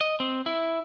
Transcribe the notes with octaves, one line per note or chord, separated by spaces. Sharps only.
D#5
C4
E4